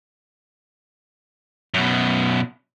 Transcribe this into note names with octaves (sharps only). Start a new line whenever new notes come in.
F#2 B2